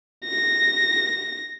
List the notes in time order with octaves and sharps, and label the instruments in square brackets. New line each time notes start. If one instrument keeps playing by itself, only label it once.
[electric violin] A#6